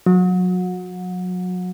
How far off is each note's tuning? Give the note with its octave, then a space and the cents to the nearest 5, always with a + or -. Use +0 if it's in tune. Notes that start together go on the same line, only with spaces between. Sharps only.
F#3 -30